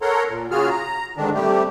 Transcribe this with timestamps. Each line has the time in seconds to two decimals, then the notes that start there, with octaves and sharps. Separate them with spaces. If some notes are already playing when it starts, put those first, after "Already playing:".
0.02 A4 A#4 C#5 F#5 A#5 C6
0.29 A#2
0.51 C#3 F4 F#4 G#4 F6
0.70 A#5
1.17 G#2 D3 D#3 D4
1.35 C3 G3 A3 G4